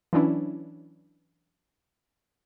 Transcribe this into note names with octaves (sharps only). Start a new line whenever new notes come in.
E3 F#3 C#4 D4 E4